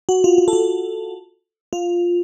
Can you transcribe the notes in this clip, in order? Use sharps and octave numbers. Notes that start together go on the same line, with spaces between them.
F#4
F4
F4
A4
F#4
F4